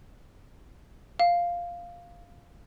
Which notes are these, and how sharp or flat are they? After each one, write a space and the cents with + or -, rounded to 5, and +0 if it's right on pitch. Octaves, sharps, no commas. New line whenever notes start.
F5 +0